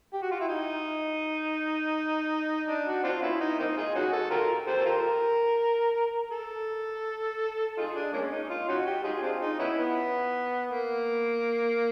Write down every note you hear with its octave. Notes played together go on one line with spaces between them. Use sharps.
G4
F#4
F4
E4
D#4
D4
F#4
C4 D4 F4
B3 C#4 E4
D#4
A#3 C4 D#4
D#4 F4 G#4
C#4 D#4 F#4
A4
F4 G4 A#4
G4 A4 C5
A4
F4 G4 A#4
A4
D#4 F4 G#4
D4
G#3 A#3 C#4
D#4
F4
C#4 D#4 F#4
G4
D#4 F4 G#4
C4 D4 F4
D#4
B3 C#4 E4
B3
A#3